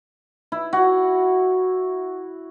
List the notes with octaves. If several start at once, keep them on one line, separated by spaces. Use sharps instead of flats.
E4
F#4